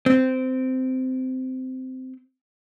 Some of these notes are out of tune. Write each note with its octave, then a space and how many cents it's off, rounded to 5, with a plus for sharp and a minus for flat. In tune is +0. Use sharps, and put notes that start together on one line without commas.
C4 -15